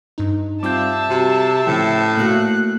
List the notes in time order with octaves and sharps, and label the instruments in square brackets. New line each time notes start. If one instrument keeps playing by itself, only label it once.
[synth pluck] G2 D#4
[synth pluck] G3 F4 F5 [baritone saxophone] C4 [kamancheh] E5 A5 [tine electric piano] D6 G6
[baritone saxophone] C3 [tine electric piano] F#4 [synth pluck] G4 A4
[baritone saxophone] A2 [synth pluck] C#3 F3 [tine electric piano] G5
[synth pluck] A#2 E6 A#6 [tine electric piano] A3 A#3 F#4 [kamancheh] F#6